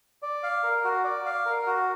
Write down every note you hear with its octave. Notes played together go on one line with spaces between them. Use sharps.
D5
F5
A#4
F#4
D5
F5
A#4
F#4